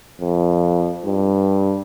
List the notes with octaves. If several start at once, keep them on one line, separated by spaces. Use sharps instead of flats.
F2
G2